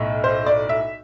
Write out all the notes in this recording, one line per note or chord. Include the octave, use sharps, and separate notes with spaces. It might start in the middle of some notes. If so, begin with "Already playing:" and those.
Already playing: B1 A2
C5
D5
E5